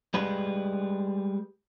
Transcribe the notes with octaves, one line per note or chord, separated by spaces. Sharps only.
G3 G#3 B4